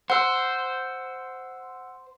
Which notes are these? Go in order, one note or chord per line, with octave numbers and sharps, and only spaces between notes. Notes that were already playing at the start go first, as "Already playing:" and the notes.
C5 F#5 E6